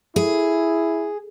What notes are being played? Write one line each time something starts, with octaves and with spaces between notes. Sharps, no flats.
E4 G#4